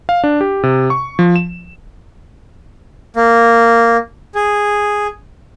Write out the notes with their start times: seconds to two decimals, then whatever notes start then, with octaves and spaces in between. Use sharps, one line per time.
0.09 F5
0.24 D4
0.41 G4
0.63 C3
0.90 C#6
1.19 F3
1.36 E7
3.16 A#3
4.35 G#4